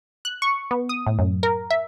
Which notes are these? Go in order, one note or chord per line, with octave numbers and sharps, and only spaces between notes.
F#6
C#6
B3
D#6
A2
F#2
A#4
E5